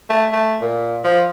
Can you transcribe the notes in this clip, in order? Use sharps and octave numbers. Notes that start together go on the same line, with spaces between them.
A3
A3
A#2
F3